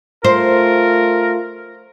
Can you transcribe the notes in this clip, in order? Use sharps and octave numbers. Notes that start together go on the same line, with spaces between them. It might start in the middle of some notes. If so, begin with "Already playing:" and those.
A3 F4 A#4 C5